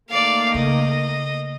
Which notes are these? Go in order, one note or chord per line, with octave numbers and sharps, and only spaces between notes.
D#3 A3 A#3 D5 F5
C#3 D#5